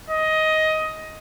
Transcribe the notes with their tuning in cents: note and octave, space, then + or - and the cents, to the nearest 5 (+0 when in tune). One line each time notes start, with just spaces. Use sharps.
D#5 +15